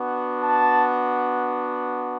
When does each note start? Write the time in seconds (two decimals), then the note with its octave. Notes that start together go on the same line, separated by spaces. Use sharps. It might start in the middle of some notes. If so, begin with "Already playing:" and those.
Already playing: B3 D4 F#4
0.42 A5